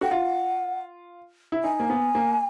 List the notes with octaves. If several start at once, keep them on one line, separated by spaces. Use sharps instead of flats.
F#4 G5
F4 F#5
E4
D#4 G#5
A#3
B3
A#3